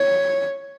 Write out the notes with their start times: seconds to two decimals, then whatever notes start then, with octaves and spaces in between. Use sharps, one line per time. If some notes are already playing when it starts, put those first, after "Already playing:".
Already playing: C#5